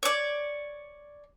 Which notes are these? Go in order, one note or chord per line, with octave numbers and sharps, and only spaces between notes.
C#5 D5